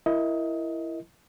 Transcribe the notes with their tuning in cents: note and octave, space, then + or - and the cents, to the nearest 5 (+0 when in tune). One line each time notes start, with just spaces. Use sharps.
E4 +15 A#4 +0 D#5 +20